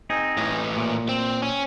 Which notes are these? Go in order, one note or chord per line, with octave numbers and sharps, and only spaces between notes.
C4 D#4 G#4
A2 E3
A#2
C4
C#4